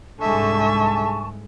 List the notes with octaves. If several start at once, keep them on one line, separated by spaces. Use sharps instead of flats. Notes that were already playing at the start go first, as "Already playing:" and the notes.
C2 G#2 D3 G#3 E5 G#5 A5 C#6